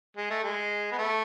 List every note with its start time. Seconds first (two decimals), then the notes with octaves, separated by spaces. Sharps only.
0.17 G#3
0.30 A3
0.43 G#3
0.92 B3
0.98 A3